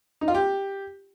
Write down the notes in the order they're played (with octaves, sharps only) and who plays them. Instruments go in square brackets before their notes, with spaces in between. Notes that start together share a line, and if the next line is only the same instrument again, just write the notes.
[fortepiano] D#4
F4
G4